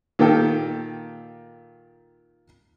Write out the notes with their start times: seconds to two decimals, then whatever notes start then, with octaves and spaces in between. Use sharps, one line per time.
0.19 A#2 D#3 G4 A4 G5